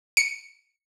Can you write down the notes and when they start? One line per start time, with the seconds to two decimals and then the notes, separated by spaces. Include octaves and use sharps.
0.17 C#7